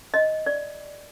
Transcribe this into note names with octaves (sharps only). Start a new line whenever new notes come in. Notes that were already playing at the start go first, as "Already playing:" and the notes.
D#5
D5